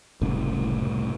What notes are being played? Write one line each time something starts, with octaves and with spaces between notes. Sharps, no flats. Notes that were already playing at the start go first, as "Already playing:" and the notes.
F#1 C2 A2 C#3